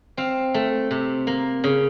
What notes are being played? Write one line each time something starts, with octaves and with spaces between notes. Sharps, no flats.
C4 F5
A3
C3
A#3
C#3